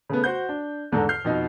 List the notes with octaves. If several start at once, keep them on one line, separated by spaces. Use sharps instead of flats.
C#3 A3 B3
F#4 C5 F#5 G6
D4
E2 G#2 D3 A4 A#5
F6 G6 C7
F2 B2 D#4